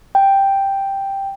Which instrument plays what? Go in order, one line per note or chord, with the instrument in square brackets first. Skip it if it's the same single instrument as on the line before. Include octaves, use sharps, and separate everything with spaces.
[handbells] G5